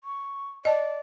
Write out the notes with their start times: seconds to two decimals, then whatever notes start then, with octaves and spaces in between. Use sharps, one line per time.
0.04 C#6
0.65 D5 D#5 A5